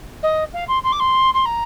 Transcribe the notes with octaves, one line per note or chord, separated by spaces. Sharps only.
D#5
F5
C6
C6
D6
C6
C6
A#5